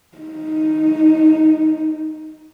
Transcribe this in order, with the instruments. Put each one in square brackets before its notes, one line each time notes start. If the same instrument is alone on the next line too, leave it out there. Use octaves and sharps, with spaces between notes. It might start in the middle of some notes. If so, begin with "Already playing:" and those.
[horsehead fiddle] D#4